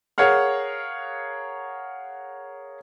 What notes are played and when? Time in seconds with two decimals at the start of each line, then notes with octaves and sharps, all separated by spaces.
0.18 G#4 A#4 C#5 F5 F#5 F6